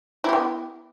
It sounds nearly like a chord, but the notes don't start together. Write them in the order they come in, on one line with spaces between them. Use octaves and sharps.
E4 G4 B3